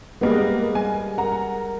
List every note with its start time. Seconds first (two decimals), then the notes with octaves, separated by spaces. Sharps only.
0.21 G3 G#3 A#3 B3 B4 D#5
0.75 G3 G#5
1.18 A#4 F#5 A#5